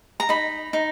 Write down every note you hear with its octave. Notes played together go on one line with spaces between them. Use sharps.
A#5
D#4 B5
D#4